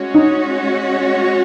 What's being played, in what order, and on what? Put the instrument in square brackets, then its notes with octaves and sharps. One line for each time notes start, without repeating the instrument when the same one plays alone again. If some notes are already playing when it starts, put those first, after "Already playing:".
Already playing: [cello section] G#3 C#4 F#4 C#5
[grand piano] D#4